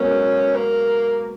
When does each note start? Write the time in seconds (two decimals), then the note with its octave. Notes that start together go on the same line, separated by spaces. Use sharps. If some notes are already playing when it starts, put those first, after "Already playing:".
Already playing: G#3 B3 C#4 F#4 A#4
0.55 A#3